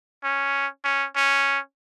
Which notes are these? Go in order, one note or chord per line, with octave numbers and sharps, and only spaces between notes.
C#4
C#4
C#4